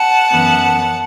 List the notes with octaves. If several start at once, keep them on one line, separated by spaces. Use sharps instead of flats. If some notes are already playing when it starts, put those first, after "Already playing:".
Already playing: F#5 A5
F#2 E3 B3